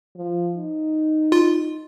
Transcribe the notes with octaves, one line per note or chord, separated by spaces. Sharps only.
F3
D#4
F4